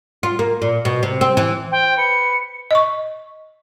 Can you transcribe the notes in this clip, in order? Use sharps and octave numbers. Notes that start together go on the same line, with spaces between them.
F4
A#3
A#2
B2
C3
C4
E3
C5 G5
B4 C#7
D#5 C#6